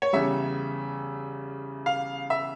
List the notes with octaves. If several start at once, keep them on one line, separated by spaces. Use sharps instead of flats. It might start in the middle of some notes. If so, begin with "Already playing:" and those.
C#5
E2 C#3 G3 E5
F5
E5